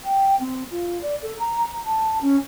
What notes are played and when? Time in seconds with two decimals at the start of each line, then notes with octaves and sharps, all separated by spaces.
0.04 G5
0.40 C4
0.71 F4
1.02 D5
1.22 A4
1.39 A#5
1.85 A5
2.21 C#4